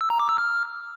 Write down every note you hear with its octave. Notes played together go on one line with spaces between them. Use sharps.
E6
A#5
D6
E6
F6